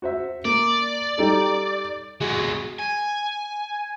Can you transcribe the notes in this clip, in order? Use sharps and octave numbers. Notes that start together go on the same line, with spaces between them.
F#4 C5 E5
A#3 D5
G3 D#4 A4
F#3 G#3 G#4
G#5